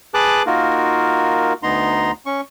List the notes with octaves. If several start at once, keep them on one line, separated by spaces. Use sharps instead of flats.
G#4 B4 A5 D6 F#6
A#3 D#4 F4 F#4 A#4
D2 B3 D#4 A#5 C6
C#4 C#6